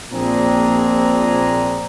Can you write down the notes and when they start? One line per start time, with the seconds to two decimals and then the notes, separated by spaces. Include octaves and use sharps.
0.12 A#1 A#2 C4 D4 G#4 A#5